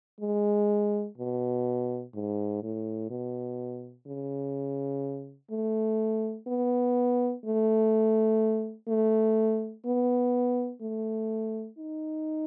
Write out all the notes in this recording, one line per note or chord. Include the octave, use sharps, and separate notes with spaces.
G#3
B2
G#2
A2
B2
C#3
A3
B3
A3
A3
B3
A3
D#4